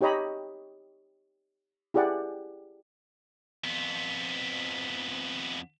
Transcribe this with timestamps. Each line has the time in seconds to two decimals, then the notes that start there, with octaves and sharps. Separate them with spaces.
0.01 D#4 G4 C#5 D#5 A#5 B5
1.94 E4 G4 G#4 D5 F#5
3.64 F2 B3